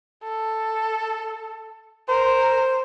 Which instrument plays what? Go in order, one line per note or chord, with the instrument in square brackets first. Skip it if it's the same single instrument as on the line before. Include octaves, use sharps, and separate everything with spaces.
[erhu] A4
[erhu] A#4 [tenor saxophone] C5